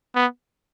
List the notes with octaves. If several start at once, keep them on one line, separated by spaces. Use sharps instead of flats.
B3